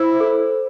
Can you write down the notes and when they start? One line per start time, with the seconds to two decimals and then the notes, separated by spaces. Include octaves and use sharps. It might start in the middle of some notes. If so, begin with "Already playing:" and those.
Already playing: E4 C5
0.20 A4